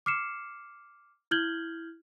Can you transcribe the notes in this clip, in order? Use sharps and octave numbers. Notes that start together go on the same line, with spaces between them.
D6 F6 C7 C#7 E7
E4 F6 G6 G#6 F#7 G7